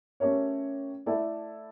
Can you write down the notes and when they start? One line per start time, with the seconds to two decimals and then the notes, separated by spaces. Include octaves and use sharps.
0.20 A3 C#4 G4 A#4 C#5
1.06 A3 E4 A4 D5